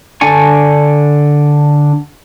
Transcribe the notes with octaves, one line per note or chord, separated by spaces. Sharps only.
D3 D4 D5 G#5 C#6